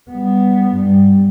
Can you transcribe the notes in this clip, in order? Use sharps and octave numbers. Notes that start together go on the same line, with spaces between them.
G3 B3
G2 G3